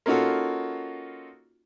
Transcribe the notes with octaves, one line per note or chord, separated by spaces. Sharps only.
A#3 C#4 D#4 F4 F#4 A4